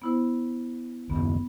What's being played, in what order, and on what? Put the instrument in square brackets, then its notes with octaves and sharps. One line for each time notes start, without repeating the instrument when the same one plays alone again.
[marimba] B3 E4 C5
[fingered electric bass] F#1 D#2 [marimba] B3